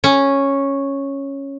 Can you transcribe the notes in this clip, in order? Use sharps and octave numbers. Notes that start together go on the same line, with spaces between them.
C#4